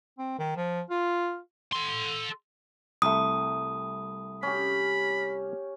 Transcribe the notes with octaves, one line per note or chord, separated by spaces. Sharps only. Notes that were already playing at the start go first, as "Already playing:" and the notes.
C4
D#3
F3
F4
A4 C6
C2 A3 D#6
C#4 G4 B5